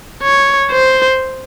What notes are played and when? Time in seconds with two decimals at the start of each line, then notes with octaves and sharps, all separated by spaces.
0.23 C#5
0.71 C5